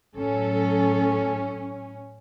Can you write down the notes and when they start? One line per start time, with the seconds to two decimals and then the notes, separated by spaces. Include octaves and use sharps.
0.15 A2 F#3 C#4 A4